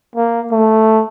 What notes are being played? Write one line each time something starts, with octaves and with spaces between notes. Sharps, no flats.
A#3
A3